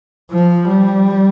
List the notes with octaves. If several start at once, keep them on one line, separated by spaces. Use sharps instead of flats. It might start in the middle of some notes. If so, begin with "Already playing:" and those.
F3
G3